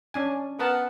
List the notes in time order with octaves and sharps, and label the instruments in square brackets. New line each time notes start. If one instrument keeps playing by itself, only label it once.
[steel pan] C#4 D4 G#5
[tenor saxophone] B3 [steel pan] A#4 F#5 A5